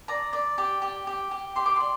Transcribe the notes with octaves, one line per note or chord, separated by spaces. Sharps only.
D5 A#5
D5
G4
G4
G4
G4
G4 C6
D6
D5 C6